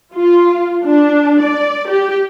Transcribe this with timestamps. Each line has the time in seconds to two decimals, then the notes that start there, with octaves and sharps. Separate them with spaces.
0.14 F4
0.86 D4
1.43 D5
1.91 G4